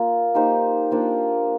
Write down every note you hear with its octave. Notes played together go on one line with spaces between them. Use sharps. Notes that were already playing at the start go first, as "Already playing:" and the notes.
Already playing: A#3 F4
A#3 D#4 G4 C5
A#3 D4 F4 C5